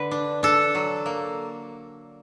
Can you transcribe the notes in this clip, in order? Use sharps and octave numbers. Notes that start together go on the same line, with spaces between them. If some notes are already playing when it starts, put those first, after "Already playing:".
Already playing: D3 B4
D4
D4 A4
F#3
A#3